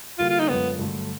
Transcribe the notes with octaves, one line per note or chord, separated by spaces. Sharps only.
D3 G3 A#3 F4
F4
D#4
F#2 D3 F3 G#3 B3
G2 D3 F#3 A3